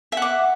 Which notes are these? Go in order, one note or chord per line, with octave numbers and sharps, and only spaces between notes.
E5 F#5 D6